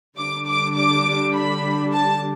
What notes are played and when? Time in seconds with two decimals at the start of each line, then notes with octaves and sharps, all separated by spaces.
0.17 D3 G3 D4 D6
0.46 D6
0.76 D6
1.35 B5
1.93 A5